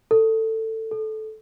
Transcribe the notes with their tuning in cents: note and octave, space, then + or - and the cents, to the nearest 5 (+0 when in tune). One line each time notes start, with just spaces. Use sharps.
A4 +15
A4 -15